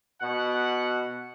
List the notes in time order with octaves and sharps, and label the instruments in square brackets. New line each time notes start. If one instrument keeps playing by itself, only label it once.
[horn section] B2 F#5